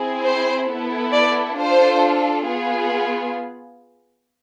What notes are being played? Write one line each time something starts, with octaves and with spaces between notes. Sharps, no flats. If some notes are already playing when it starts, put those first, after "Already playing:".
Already playing: C4 E4 G#4
C5
B3 E4 A4
D5
D4 F4 A4 C5
B3 F4 G#4